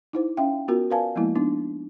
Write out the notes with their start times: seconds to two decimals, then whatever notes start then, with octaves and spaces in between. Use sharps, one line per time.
0.13 D#4 E4 C5
0.37 C#4 E5 F5 G5
0.68 B3 F4 F#4 A#4
0.90 A#4 B4 D5 F5 G#5 A5
1.16 F3 G#3 A#3 B3 E4
1.35 B3 D4 D#4